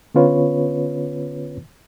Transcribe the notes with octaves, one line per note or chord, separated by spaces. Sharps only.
D3 B3 C#4 F4 B4 C#5